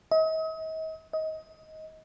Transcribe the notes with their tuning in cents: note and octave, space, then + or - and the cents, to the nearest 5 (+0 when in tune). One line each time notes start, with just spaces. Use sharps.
D#5 +40
D#5 +20